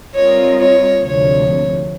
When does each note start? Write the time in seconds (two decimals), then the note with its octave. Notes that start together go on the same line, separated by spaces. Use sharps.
0.15 G3 C4 F4 A#4 C#5 D#5
0.59 C#5
1.02 D2 C3 F3 C#5